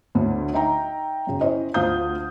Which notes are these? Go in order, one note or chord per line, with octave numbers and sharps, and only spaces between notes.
D2 A2 D3 A3
D#4 E5 G5 A#5
F#2 C#3
C#4 E4 C5 C#5 D#5
D2 F4 C5 F5 D#6 G6